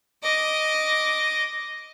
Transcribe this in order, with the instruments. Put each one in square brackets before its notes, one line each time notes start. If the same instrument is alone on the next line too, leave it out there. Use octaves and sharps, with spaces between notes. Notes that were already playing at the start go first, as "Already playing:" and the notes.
[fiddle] D#5 D6